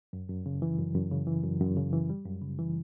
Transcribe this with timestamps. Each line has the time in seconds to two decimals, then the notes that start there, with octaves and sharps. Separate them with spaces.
0.13 F#2
0.29 F#2
0.46 C#3
0.62 E3
0.79 F#2
0.95 F#2
1.11 C#3
1.27 E3
1.44 F#2
1.61 F#2
1.77 C#3
1.93 E3
2.10 G3
2.26 F#2
2.42 C#3
2.59 E3